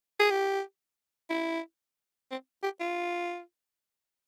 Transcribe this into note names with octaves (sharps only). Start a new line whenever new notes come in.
G#4
G4
E4
C4
G4
F4